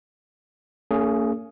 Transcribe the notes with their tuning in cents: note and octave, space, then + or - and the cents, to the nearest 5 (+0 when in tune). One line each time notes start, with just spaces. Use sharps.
A#3 -45 C#4 +30 G#4 +0